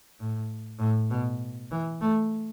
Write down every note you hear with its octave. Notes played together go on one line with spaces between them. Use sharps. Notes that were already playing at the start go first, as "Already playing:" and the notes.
A2
A2
B2
E3
A3